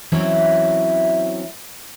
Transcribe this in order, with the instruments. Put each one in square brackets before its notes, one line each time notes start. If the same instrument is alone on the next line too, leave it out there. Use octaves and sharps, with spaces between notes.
[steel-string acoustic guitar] E3 F#3 C4 C#4 E4